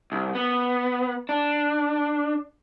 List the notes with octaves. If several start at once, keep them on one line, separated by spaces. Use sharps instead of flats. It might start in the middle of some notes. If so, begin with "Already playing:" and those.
C2
B3
D4